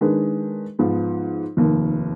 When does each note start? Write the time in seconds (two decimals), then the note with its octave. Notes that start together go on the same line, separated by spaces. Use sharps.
0.01 D#3 G#3 D4 G#4 B4
0.79 G#2 F3 B3
1.57 F1 D#2 D#3